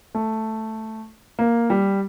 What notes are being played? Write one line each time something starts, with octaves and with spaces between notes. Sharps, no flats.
A3
A#3
G3